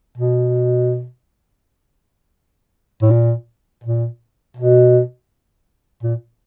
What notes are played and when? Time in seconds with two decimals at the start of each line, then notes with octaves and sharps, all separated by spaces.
0.18 B2
3.02 A2
3.11 A#2
3.84 A#2
4.57 B2
6.03 A#2